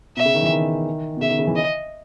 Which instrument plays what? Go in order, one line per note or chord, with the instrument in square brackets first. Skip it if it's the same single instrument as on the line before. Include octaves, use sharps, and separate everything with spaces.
[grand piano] B2 [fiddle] E5
[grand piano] C#3
D#3
E3
D#3
B2
[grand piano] C#3 [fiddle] E5
[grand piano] D#3
C#3
E3
[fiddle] D#5